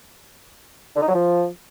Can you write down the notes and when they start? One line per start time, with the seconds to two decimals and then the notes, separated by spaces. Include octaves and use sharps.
0.96 D3
1.02 D#4
1.08 F#3
1.15 F3